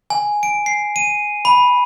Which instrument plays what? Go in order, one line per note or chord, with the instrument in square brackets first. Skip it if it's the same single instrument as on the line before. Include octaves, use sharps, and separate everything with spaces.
[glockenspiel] G#5
D7
C7
D#7
B5